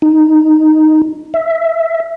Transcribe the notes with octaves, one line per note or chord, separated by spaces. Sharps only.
D#4
E5